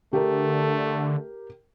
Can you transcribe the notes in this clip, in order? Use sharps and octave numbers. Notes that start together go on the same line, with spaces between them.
D3 A3 G4 A#4